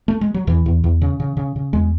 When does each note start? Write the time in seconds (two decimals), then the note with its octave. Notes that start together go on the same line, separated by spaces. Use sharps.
0.08 A3
0.21 G#3
0.34 F#3
0.47 E2 E3
0.66 E2
0.84 E2
1.02 C#3
1.20 C#3
1.37 C#3
1.56 C#3
1.73 E2 G#3